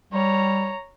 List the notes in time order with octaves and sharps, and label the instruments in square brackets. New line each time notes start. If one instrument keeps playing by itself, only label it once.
[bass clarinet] G3 [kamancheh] C#5 A#5